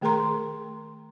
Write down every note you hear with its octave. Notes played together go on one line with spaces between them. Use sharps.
D#3 A3 G#4 A#4 A#5 C6